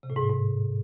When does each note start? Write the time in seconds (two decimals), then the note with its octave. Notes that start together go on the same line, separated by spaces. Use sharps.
0.03 C3
0.10 A2
0.16 G#2
0.23 A2
0.29 G#2